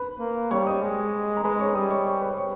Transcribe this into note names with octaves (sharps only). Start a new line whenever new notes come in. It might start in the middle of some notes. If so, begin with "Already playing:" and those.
Already playing: B4 B5
A#3
G3 C#5 C#6
D#5 D#6
G#3
A#5
G#3 B4 B5
C#5 C#6
G3 D#5 D#6
C#5 C#6
C#5 C#6
B4 B5
C#5 C#6